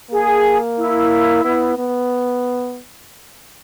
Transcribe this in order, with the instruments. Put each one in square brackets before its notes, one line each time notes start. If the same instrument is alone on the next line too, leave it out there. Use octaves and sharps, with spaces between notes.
[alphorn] A#3 [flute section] G#4
[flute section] E4
[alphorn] B3
B3